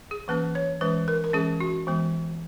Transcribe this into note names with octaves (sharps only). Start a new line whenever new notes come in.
G#4
E3 A#3 C#4 B4
C#5
E3 G#3 C#4 B4
A#4
A#4
E3 G#3 C#4 G#4
F#4
E3 G#3 B3